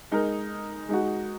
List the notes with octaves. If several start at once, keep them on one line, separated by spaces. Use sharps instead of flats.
G#3 D#4 A#4
G#3 D#4 F#4